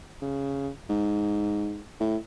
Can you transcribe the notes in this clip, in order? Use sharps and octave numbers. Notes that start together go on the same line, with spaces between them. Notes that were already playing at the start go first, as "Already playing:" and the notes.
C#3
G#2
A2